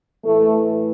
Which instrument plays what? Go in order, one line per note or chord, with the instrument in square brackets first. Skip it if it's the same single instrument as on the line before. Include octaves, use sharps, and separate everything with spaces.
[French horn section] A2 E3 A3